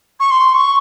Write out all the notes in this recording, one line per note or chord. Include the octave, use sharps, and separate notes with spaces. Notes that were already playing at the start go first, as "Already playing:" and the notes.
C#6
C6
C#6